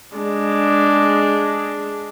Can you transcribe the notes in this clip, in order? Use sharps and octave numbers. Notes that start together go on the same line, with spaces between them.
G#3 D4